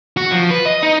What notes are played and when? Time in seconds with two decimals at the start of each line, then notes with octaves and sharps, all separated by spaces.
0.17 F#4
0.32 F3
0.51 B4
0.66 D#5
0.83 D#4